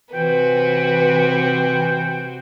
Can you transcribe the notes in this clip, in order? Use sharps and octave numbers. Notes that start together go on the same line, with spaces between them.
C3 E3 F#4 B4 C5 G5